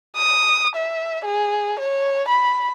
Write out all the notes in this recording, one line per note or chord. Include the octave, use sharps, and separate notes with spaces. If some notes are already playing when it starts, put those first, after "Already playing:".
D#6
E5
G#4
C#5
B5